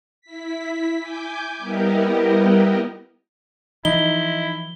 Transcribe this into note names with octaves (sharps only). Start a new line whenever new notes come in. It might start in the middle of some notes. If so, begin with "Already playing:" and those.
E4 B6
G#5 D6 G6
G3 B3 E4 G4 A#4 D#5
E3 F3 D#4 E4 G7